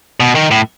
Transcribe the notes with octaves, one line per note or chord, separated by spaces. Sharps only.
B2
D#3
A2